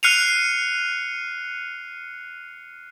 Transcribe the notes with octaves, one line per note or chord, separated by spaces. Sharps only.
F6 F#6 C7 C#7 D#7 F7